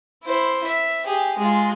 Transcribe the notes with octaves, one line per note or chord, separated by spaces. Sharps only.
E4 C5
E5
G4 G#4
G#3 F4